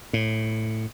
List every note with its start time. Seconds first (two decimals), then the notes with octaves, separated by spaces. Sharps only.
0.13 A2